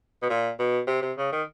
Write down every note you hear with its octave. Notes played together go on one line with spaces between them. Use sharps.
B2
A#2
B2
C3
C3
C#3
D#3